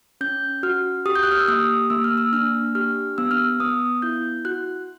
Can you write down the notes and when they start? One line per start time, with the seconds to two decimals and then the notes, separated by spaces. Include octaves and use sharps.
0.21 C#4 G6
0.63 F#4 F6
1.06 G4 D#6
1.16 G6
1.23 F#6
1.32 F6
1.40 E6
1.48 A#3 D#6
1.90 A#3 E6
2.04 F6
2.18 E6
2.33 D4 F6
2.75 G4 F6
3.18 B3 E6
3.31 F6
3.44 E6
3.60 B3 D#6
4.02 E4 G6
4.45 F#4 F#6